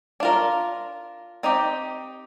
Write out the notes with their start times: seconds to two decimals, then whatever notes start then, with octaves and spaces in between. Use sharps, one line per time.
0.20 D4 F4 A#4
1.43 C4 D#4 G4